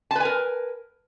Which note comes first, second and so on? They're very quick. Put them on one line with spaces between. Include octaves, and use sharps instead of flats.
A5 B4 G#5 A#4